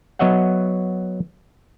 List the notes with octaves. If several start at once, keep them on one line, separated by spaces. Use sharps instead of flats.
F#3 B3 C#5 D#5 E5 F#5